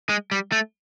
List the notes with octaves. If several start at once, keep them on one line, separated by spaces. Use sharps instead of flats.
G#3
G3
A3